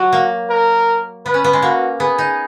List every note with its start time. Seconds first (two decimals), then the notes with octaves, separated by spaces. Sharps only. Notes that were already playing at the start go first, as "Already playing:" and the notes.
Already playing: F#3 F#4
0.13 A#3
0.50 A#4
1.25 B3 B4
1.34 C#4
1.44 B3
1.53 G#3
1.62 A#3 F#4
2.00 B3 G#4
2.18 D#4